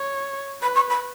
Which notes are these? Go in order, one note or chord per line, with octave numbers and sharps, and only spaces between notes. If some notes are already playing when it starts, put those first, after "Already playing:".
Already playing: C#5
B4 B5
C#6
B5